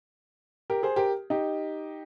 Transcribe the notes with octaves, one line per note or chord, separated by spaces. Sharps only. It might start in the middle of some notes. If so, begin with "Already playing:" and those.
G4 A#4
G#4 C5
G4 A#4
D#4 G4